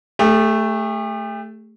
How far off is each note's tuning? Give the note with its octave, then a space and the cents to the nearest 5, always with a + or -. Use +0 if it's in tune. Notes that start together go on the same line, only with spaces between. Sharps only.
A3 +0 G4 +45